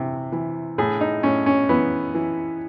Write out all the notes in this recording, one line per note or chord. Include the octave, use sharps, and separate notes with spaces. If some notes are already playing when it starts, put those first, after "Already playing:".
Already playing: C3 E3
E3
A2 G#4
D#4
A2 C#4
C#4
E3 B3
E3